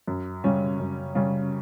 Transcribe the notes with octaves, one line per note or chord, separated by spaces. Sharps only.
F#2
C#3 G3 C#4
F#2
C#3 G3 C#4